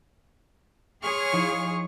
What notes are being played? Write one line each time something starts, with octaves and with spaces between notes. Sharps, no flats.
G#4 C#5 C6 C#6 F6
F3 D#4 E4